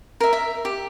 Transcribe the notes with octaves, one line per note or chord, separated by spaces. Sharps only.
A#4 E5
E5
G4